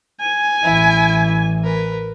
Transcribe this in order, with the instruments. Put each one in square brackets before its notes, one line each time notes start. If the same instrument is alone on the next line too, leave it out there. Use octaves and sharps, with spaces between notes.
[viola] G#5
[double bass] A1 E3 [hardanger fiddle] E4
[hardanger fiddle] A#4 B4